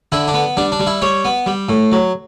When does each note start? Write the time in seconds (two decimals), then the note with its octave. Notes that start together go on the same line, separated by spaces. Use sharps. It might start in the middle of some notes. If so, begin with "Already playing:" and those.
0.12 D3 E4
0.28 D4
0.34 B3
0.57 G3 D4
0.72 D4
0.80 G3
0.87 E4
1.02 G3 C#5
1.25 B3
1.46 G3
1.69 A2
1.92 F#3